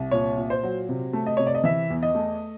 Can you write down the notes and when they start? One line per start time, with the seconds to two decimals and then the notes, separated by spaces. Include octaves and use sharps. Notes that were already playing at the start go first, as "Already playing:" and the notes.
Already playing: C2
0.11 A#2 C#5
0.38 A#2
0.50 C5
0.63 F#3
0.89 C3
1.13 A3
1.26 D#5
1.37 C3 C#5
1.46 D5
1.55 D#5
1.64 E3 E5
1.90 E2
2.03 D#5
2.15 A3